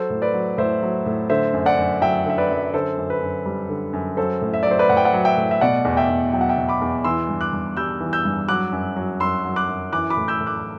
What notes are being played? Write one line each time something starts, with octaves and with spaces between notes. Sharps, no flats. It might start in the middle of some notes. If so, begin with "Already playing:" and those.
Already playing: F#3 A4 C5
A2
B4 D5
F#3
A2 C5 E5
F#3
A2
D3 C5 E5
F#2
D5 F#5
F#2
F#3 E5 G5
D3 E5
B4 D5
F#2
D3 A4 C5
F#2
B4
F#2
G3
D3
F#2
F#3 A4 C5
A2
E5
F#3 D5
C5
B4 D5
A2 F#5
G5
D5 F#5
F#3
E5 G5
A2
E5
B2 D5 F#5
E2
E5 G5
E2
F#3 G5
F#5
E5 G5
B2
B5 D6
E2
E3 C6 E6
G2
D6 F#6
G2
G3 E6 G6
E3
E6 G6
G2
F#3 D6 F#6
F#2
F#3
F#2 C6 E6
F#3
D6 F#6
F#2
E3 D6 F#6
B5 D6
A2
E6 G6
A2
D6 F#6